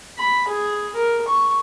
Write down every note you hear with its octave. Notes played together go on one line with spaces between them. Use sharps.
B5
G#4
A#4
C#6